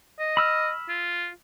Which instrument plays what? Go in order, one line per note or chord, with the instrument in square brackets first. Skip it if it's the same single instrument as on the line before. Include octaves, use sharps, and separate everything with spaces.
[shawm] D#5
[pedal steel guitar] B5 E6 F6
[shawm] F4